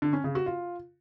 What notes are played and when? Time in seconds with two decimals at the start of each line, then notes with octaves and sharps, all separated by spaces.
0.02 D3
0.13 C#4
0.24 C#3
0.35 F#4
0.46 F4